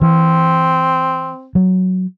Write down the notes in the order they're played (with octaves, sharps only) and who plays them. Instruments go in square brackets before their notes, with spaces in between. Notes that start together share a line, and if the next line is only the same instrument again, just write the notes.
[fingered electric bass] E3 [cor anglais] C4
[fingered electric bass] F#3